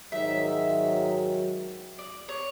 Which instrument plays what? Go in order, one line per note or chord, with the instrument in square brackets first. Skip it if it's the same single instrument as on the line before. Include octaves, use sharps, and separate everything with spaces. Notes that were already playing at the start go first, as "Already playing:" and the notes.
[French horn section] G#2 D#3 F#3 [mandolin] E5
[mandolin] D5
C#5